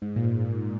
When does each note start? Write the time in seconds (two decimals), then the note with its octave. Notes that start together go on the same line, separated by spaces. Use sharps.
0.02 G#2
0.16 A#2
0.30 A#2
0.45 G#2